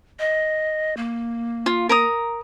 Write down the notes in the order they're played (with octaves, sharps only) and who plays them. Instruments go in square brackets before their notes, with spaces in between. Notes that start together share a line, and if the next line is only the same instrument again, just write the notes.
[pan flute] D#5
A#3
[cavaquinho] F4
A#4 A#5 D#6